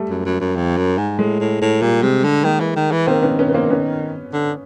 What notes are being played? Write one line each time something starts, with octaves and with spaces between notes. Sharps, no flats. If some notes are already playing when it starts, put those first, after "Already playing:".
Already playing: G3 A3
F#2
F#2
F#2
F2
F#2
G#2
A2 G#3
A2
A2
A#2 G3
C3 G#3
D3 G#3
D#3 G#3 A#3
E3
D#3
E3
D#3 A#3 C4
B3 C#4
B3 C#4
B3
A#3 C4
B3 C#4
D3